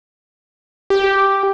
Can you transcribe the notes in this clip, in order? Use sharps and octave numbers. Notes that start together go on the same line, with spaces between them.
G4